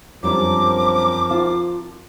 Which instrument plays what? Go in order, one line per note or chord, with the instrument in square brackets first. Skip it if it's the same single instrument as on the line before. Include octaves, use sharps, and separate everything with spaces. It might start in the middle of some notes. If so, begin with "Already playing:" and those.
[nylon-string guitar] F#2 G3 D4 [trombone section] F3 C4 A#4 [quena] D6
[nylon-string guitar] F4 F5 A5